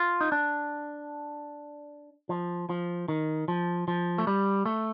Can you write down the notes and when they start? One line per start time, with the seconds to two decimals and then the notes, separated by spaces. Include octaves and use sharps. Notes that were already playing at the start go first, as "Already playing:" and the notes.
Already playing: F4
0.21 D#4
0.32 D4
2.29 F3
2.69 F3
3.08 D#3
3.48 F3
3.88 F3
4.18 A3
4.27 G3
4.66 A3